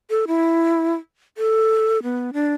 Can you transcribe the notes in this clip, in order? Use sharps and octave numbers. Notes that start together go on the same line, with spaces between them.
A4
E4
A4
B3
D4